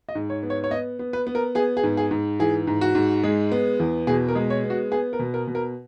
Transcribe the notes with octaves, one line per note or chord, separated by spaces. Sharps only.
D#5
G#2
C#5
B3
C#5
C#5
B3 D#5
B3
B4
B3
A#4
B3 G#4
G#4
G#2
G#4
G#2
E3 G#4
G#2
F#4
G#2
G#3
B3
E2
B2 G#4
A#4
G#3
C#5
B3
F#4
B3 G#4
A#4
B2
A#4
B2
A#4